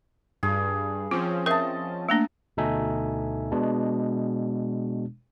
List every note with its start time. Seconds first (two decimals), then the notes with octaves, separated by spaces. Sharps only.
0.43 G2 G#4
1.11 F3 C4 C#4 F4
1.46 A#4 D#5 E5 A5
2.09 A3 A#3 D4
2.57 D2 B2 D#4 A4 E5 G#5
3.52 B2 G#3 D4